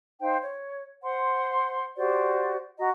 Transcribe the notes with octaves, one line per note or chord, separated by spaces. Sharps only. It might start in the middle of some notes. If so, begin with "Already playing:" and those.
D#4 C5 F5 G5
C#5
C5 F#5 C6
F#4 G4 C5 D5
F#4 D#5 A#5